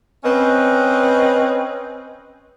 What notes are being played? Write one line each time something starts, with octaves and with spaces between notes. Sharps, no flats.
C4 C#4 B4 D#5